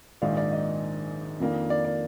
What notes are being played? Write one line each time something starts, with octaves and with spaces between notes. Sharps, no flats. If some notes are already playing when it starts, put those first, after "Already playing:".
A#1 G#2 D#3 D5 F5
D5 F5
D#5
F2 D#3 A#3 D4
D5
D5